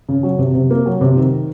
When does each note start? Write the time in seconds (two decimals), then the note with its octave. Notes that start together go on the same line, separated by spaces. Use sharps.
0.09 C#3
0.23 F#3
0.39 C3
0.54 C3
0.71 A#3
0.86 F#3
1.01 C3
1.17 D#3